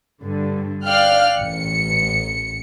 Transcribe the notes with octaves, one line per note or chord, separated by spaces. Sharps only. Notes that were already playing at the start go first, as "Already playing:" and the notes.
G2 D3
D5 F5 G5 F6 F#6
A1 C#7